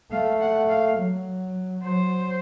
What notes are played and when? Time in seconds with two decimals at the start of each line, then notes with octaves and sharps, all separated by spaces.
0.12 A3 F5
0.41 F#5
0.69 F5
0.97 F#3
1.84 F#3 C5